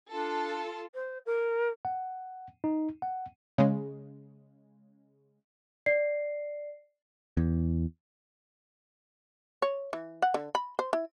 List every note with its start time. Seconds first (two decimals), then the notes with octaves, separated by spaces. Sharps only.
0.12 D4 F4 A4
0.95 C5
1.26 A#4
1.85 F#5
2.64 D#4
3.02 F#5
3.58 C#3 G#3
5.86 D5 C7
7.37 E2
9.62 C#5
9.93 E3
10.22 F#5
10.34 D3
10.55 B5
10.79 C5
10.93 E4